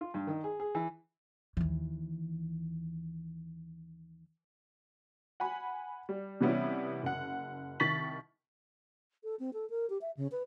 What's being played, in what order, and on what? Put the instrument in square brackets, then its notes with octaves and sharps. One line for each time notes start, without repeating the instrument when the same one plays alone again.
[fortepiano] F4
G2
D#3
G#4
G#4
E3
[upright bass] D#2 E3
[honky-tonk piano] F#5 G#5 B5
G3
C3 E3 G3 B3 C#4 E4
F#1 F#5
C2 D#3 C#6 A6 B6 F#7
[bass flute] A4
C4
A4
A#4
G4
E5
C#3
B4